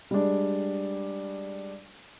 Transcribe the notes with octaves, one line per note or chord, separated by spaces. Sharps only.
G3 G#3 D4